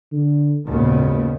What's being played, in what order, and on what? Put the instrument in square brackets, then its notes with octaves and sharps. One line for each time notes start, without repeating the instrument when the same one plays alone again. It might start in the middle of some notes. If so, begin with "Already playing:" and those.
[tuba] D3
[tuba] G#1 [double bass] D#2 [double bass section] A#2 C#3 B3